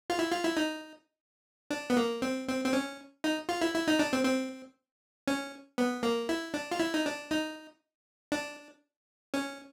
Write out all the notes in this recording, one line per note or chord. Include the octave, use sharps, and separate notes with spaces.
F4
E4
F4
E4
D#4
D4
B3
A#3
C4
C4
C4
C#4
D#4
F4
E4
E4
D#4
D4
C4
C4
C#4
B3
A#3
E4
D4
F4
E4
D#4
D4
D#4
D4
C#4